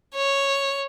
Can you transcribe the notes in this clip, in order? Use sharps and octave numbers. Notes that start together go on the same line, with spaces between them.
C#5